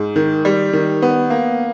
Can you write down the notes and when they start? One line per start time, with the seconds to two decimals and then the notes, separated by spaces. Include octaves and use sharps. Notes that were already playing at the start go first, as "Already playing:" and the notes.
Already playing: G#2
0.16 D#3
0.45 G3
0.73 D#3
1.02 B3
1.30 A#3